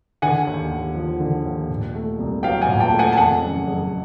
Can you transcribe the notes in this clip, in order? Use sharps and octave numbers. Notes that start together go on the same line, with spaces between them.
D3 F#5 G#5
D#2
D#2
F3
D3
D#2
A#2
A3
C2
F#3 F5 G5
F#5 G#5
A#2
G5 A5
A3
F#5 G#5
A5
F2 F#5 G#5
F#1
F#1